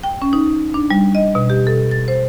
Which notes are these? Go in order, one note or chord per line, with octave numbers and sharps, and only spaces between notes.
G5
C#4
D#4
D4
G3
D#5
B2
G4
A4
A6
C5